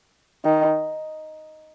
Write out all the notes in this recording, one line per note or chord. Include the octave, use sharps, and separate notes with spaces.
D#3